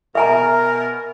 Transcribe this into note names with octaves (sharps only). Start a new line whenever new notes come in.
B2 A#4 E5 G#5 A#5